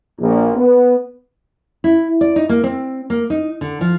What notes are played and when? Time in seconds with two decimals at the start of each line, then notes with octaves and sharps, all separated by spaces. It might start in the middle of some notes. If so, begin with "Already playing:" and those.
0.20 A#1
0.56 B3
1.84 E4
2.21 D5
2.36 D#4
2.49 A#3
2.64 C4
3.10 A#3
3.30 D#4
3.61 D3
3.81 F3